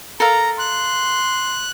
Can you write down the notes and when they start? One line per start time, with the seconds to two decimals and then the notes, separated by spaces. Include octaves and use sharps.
0.20 A4 A#4 F5 A#5
0.59 C6 F#6